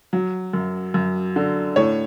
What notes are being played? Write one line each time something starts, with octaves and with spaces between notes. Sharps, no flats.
F#3
F#2
F#2
D3
A2 C#5